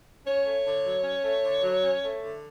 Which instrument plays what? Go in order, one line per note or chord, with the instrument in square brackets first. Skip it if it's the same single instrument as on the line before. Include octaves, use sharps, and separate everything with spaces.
[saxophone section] C#4 C#5
A3
D3
F#3
C#4
A3
D3
F#3
C#4
A3
D3